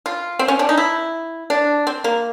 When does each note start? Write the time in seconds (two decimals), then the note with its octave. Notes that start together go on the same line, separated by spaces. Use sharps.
0.06 F4
0.39 C4
0.48 C#4
0.59 D4
0.69 D#4
0.77 E4
1.50 D4
1.87 C4
2.04 A#3